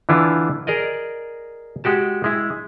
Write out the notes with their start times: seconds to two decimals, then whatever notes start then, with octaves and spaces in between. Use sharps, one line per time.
0.09 D3 E3 D4 E4 F4
0.67 G#4 A#4 D5 D#5
1.84 G#3 F#4 G4 A5
2.24 G#3 E4